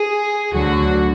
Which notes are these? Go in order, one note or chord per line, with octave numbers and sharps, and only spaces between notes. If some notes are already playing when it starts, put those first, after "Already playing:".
Already playing: G#4
D2 D3 F#3 F#4